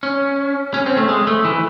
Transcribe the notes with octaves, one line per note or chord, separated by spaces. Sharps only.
C#4
C#4
C4
A3
G#3
A3
E3